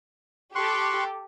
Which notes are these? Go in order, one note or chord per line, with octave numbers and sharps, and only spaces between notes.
G4 A4 C6 C#6 F#6